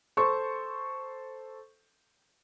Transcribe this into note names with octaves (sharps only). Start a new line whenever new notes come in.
A4 C5 C#6